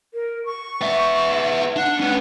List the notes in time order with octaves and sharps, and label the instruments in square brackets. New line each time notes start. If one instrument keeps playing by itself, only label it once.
[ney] A#4
C#6
[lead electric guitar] B3 E5
[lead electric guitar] D4 [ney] F#5
[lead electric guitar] C#4 B4